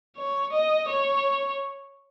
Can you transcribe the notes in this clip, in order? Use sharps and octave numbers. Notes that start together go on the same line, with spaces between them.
C#5
D#5
C#5